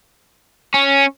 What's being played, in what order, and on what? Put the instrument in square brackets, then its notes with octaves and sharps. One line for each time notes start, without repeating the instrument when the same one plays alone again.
[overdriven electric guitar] C#4